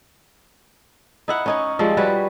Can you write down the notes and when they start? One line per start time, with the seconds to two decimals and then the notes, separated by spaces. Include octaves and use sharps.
1.28 D#4 E4 F#5
1.46 C#4 D#4 C#5
1.79 F3 G3 G#3 C4
1.97 G3 F#4 B4 C#5